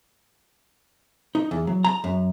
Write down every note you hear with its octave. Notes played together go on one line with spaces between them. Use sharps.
D#4
E2
F#3
A#5
F#2